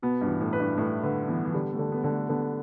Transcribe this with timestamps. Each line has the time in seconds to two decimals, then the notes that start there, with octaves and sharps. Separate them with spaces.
0.02 B2 B3
0.21 G2
0.27 E3
0.41 A2
0.53 B4
0.60 G2
0.77 A2 E4
1.03 D3 B4
1.28 E3 B3
1.45 E3
1.54 D3 G3
1.73 A3
1.79 D3
1.92 B3
2.04 D3
2.10 A3
2.29 D3 B3